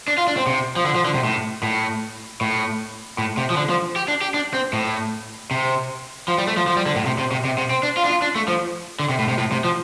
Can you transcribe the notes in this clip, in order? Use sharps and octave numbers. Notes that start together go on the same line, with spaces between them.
D4
F4
D4
C4
C3
F3
D3
F3
D3
C3
A2
A2
A2
A2
C3
F3
D3
F3
G4
D4
G4
D4
C4
A2
C3
F3
G3
A3
F3
F3
G3
D3
A2
C3
C3
C3
C3
C3
C4
D4
F4
D4
F4
D4
A3
F3
D3
C3
A2
C3
A2
C3
F3